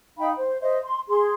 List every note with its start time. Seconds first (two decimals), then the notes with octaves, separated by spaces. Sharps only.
0.18 D#4 F5 G5 B5
0.35 C5
0.61 C5 D#5 E5
0.82 C6
1.08 G#4 C6